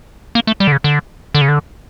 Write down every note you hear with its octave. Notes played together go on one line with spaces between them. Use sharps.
A#3
A3
G3
D3
C#3
D3
D3
C#3
D3